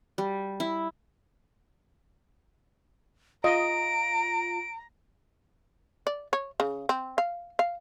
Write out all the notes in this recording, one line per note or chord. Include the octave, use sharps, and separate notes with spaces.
G3
E4
F4 D#5 A#5 D7
D5
C#5
C#3
C4
F5
F5